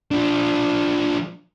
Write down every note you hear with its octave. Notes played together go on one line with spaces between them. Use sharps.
F3 D4